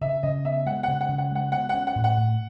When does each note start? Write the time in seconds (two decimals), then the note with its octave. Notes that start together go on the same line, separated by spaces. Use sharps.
0.01 C#3 E5
0.23 C#3 D#5
0.45 B3 E5
0.66 G#3 F#5
0.83 F#5
0.88 C#3
1.01 F#5
1.09 C#3
1.18 F#5
1.31 G#3 F#5
1.52 B3 F#5
1.69 F#5
1.74 C#4
1.87 F#5
1.96 A2
2.04 F#5
2.17 A2